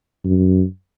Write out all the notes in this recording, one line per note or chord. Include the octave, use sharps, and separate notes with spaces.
F#2